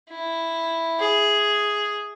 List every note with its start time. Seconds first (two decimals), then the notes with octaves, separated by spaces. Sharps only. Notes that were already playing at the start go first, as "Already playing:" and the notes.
0.10 E4
0.99 G#4